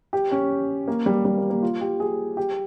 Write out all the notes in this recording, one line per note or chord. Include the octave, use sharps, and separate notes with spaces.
G4
C#4
A#3
G3
G3
A#3
A#3
F4
G4
G#4
G4